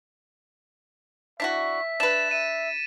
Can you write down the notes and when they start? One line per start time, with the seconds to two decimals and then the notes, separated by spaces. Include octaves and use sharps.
1.40 D4 E4 F#4 E5 B6
2.00 D4 B4 A6 B6 E7
2.31 E5 D#7